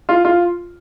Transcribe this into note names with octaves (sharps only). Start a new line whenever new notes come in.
F4
F4